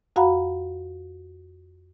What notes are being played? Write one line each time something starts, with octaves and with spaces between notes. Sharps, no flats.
F2 F#4 F5 F#5 A#5 B5